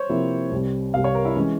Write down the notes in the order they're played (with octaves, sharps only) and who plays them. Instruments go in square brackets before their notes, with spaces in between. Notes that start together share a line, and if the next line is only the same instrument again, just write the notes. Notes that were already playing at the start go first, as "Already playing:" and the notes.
Already playing: [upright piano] C5 C#5
[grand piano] C3 F3 A#3 E4
C2 C3 G3
[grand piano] C2 C3 G3 [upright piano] F5
[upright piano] C#5
A#4
E4
[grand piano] E3 G#3 [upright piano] C#4